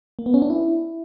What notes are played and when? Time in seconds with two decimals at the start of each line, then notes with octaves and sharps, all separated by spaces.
0.19 A#3
0.26 B3
0.34 C#4
0.42 D4
0.50 E4